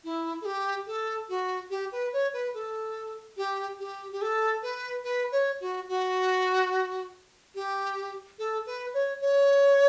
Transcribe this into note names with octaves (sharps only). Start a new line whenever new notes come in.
E4
A4
G4
A4
F#4
G4
B4
C#5
B4
A4
G4
G4
G4
A4
B4
B4
C#5
F#4
F#4
G4
A4
B4
C#5
C#5